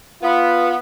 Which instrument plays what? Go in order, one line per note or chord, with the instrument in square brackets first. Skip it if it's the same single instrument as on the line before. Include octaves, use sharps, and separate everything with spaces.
[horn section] B3 [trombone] F4